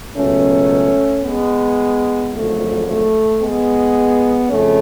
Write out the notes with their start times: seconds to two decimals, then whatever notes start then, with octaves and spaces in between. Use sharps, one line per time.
0.16 C#2 B2 F#3 A3 C#4
1.24 G#3 B3
2.32 G#1 F#2 D3 F3 A3
2.87 A3
3.41 G#3 B3
4.50 F2 C#3 A3 C#4